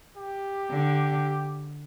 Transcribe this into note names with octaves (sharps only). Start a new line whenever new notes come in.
G4
D3